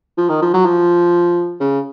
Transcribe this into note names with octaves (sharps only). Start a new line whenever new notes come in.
F3
D#3
F3
F#3
F3
C#3